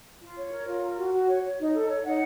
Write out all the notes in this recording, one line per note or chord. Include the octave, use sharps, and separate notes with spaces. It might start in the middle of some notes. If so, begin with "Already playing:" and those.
F4
C#5
A#4
F4
A#4
F#4
F#4
C#5
C#5
D#4
A4
C#5
D#4 F#5